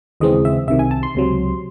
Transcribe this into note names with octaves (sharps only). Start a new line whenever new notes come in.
D#2 C#3 E3 G#3 C4 D#5
E5
C2 C3 D#3 E5
G#5
A5
C6
C#2 C3 F#3